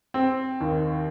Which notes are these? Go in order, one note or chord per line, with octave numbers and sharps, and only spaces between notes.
C4
D#2 D#3